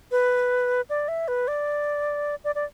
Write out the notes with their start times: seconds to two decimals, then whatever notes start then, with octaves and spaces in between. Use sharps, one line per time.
0.11 B4
0.90 D5
1.08 E5
1.28 B4
1.48 D5
2.44 D5
2.55 D5